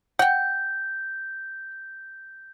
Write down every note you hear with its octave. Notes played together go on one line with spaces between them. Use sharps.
F#5 G5 G6